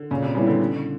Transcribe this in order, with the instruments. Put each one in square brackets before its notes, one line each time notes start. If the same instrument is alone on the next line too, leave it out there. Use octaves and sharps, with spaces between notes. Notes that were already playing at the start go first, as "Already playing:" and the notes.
Already playing: [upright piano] D3
[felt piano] A#2 [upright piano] C#3
[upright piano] C3
[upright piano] C#3 [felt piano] G3 B3 E4
[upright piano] D3
[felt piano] C#3